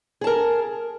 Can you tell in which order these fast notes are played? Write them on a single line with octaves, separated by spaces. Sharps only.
G#4 A5 A#4